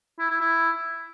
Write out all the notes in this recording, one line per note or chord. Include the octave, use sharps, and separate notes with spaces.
E4
E4
E4